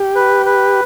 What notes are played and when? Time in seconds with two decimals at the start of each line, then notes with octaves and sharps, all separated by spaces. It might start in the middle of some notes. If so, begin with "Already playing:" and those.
Already playing: G4
0.15 B4
0.46 B4